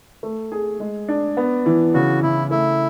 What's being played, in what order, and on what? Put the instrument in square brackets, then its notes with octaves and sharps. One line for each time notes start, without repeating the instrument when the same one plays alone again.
[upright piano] A3
G#4
G#3
D4
B3
E3
[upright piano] C#3 [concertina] F#4
[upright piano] C#3 [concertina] E4
[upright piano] A3 [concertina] E4